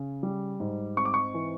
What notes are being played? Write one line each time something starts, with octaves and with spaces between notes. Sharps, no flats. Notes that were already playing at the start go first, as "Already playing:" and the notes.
Already playing: C#3
G3
G#2
C4 C#6
D6
C#6
E3